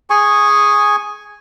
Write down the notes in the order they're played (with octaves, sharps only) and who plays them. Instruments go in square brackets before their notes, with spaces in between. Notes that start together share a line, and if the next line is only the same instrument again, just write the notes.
[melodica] G#4 G#5 C#6